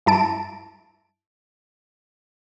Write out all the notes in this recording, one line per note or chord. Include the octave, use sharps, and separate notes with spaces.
G2 E4 A5 D7